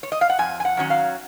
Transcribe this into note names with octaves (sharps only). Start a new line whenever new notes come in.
C#5
D#5
F5
F#5
F2 G#5
G#5
F#5
D#3 F#3 C#4
F5